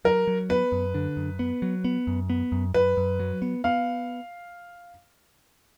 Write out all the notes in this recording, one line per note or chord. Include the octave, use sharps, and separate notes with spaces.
F#3 A#4
F#3
B3 B4
F#2
D3
F#2
B3
F#3
B3
F#2
B3
F#2
F#2 B4
F#2
F#3
B3
B3 F5